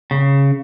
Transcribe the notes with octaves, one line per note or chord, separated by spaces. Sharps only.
C#3